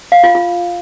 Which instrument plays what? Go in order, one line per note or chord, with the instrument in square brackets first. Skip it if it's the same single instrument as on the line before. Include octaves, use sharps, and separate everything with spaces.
[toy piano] F5
F4
F4